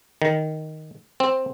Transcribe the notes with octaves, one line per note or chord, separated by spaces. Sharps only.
D#3
C4